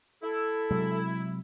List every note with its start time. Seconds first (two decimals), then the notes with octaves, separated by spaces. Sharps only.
0.22 E4 A4
0.71 C3 F#3 G#3